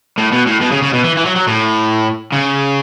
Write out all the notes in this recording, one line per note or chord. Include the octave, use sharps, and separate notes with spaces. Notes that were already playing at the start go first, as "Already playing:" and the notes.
A2
B2
A2
B2
C#3
C#3
B2
E3
E3
F#3
F#3
A2
C#3